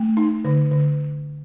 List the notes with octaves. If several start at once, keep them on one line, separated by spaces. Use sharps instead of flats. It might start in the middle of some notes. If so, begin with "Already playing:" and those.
Already playing: A3
D#4
D3
D3